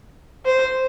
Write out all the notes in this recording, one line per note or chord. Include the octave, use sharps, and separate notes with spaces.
C5